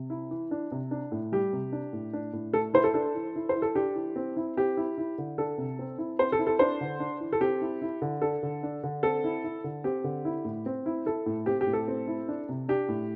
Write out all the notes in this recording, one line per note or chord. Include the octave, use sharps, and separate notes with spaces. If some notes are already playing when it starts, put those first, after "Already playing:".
Already playing: C3
E4
E3
D4
C3
D4
A2
G3 G4
C3
D4
A2
D4
A2
A3 A4
E4 C5
A4
D4 A4
E3
E4
C5
E3
A4
D4 G4
E3
C4
E4
C4 G4
E4
E4
D3
D4 A4
C3
C4
E4
C4 C5
A4
E4
A4
D4 C5
D3
D4
E3
A4
C4 G4
E4
E4
D3
D4 A4
D3
D4
D3
C4 A4
E4
E4
D3
C4 G4
D3
E4
A2
C4
E4
E4 A4
A2
C4 G4
G4
A2
A4
C4
E4
D4
C3
D4 G4
A2